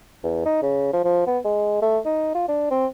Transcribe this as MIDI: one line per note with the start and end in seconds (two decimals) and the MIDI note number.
0.23 0.43 40
0.46 0.61 63
0.62 0.90 49
0.93 1.02 53
1.05 1.23 53
1.27 1.39 59
1.45 1.79 56
1.82 1.99 57
2.05 2.31 63
2.35 2.46 65
2.48 2.70 62
2.71 2.87 60